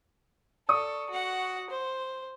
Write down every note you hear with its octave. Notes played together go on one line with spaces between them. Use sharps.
A4 D5 C#6 D#6
F#4 F#5
C5